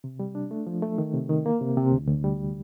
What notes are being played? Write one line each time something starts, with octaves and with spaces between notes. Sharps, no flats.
C3
G3
D4
A3
F3
A3
D#3
C3
D#3
A#3
C3
C3
D2
D2
G3